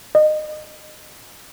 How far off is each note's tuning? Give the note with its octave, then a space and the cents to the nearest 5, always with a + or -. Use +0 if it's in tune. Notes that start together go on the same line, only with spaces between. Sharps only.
D#5 -25